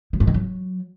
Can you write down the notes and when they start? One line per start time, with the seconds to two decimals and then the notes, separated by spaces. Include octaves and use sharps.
0.13 F#3
0.20 G2
0.27 D#3
0.34 F#3